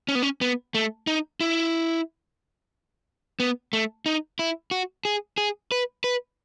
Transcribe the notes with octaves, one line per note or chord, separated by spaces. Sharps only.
C#4
B3
C#4
B3
A3
D#4
E4
B3
A3
D#4
E4
F#4
G#4
G#4
B4
B4